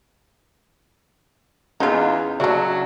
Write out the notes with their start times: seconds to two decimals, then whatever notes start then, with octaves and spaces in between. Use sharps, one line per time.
1.80 E2 C#4 D#4 F4 G#4 A#5
2.40 C#3 F#3 D4 E4 F#4 D5 C#6